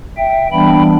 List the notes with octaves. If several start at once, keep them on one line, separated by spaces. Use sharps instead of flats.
E5 G5
E3 G3 B3 D4 G5 B5